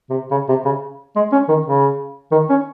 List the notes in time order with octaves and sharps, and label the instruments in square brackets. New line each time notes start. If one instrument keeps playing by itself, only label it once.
[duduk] C3
C#3
C3
C#3
G#3
C#4
D#3
C#3
D#3
C#4